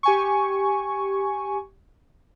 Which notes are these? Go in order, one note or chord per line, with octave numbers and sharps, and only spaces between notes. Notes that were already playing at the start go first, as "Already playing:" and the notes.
G4 G#5 C#6